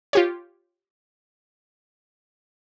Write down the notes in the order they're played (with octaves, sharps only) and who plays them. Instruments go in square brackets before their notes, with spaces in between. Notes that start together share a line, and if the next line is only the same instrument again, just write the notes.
[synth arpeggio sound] F4 G4 C#5